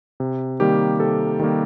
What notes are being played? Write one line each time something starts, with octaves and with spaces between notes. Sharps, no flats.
C3
D#3 G3 A#3 G4
C3 A4
D#3 G3 A#3